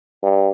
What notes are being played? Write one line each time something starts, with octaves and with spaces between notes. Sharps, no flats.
G2